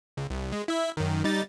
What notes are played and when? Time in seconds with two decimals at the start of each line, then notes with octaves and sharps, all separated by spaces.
0.17 C#2
0.30 C2
0.52 G#3
0.68 E4 E5
0.97 F#2 D#3
1.24 G3 D#4 A6